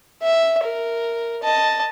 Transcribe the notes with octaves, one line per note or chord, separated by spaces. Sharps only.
E5
A#4
D#5 A5